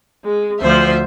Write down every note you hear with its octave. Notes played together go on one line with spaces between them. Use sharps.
G#3
D2 F3 C5 E5